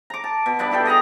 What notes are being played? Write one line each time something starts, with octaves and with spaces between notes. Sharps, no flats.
A#5 D6
A5
B2
G2 D4 B4 D5
E4 G4 A4 G5
G#4 D#5 F#5 A#5